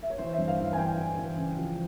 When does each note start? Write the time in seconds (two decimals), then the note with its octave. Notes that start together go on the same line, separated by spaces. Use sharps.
0.03 E5
0.10 C#5
0.18 E3 C5
0.33 G2 E5
0.48 F5
0.59 E3 F5
0.73 G#5
0.77 E3 G5
0.98 E3
1.18 E3
1.37 C#3
1.57 F3